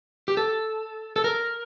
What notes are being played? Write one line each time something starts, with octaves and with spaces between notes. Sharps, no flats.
G4
A4
A4
A#4